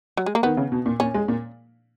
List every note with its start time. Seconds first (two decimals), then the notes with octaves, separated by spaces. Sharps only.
0.17 F#3
0.26 G#3
0.35 A#3
0.43 D#3 B3
0.57 C#3
0.72 B2
0.86 A#2
1.00 A#2 C#4
1.14 G#3
1.28 A#2